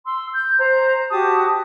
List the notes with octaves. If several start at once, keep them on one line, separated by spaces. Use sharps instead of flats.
C6 E6
G6
C5 A#5
F#4 G4 A5 D#6